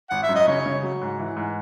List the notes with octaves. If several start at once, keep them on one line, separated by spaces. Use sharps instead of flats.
G#1 F#5
E5
F#2
D#5
C#3 C#5
C#3
F#3
G#2
E3
G#2